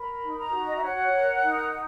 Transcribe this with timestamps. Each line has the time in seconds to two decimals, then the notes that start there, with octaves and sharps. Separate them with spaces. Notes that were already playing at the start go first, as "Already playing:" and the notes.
Already playing: A#4 B5
0.24 D#4
0.39 A#5
0.53 F#4
0.67 D#5
0.76 E5
0.83 C#5 F#5
1.14 A#4
1.44 D#4